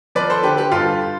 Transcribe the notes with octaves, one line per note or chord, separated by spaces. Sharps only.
F3 B4 D5
A4 C5
D3 G4 B4
G4 B4
G2 F4 A4